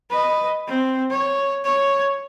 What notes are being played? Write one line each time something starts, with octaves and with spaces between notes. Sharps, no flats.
B4 D#5
C4
C#5
C#5